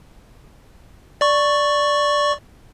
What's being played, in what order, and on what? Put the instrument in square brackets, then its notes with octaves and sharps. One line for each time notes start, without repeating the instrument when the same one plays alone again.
[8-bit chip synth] D5 C#6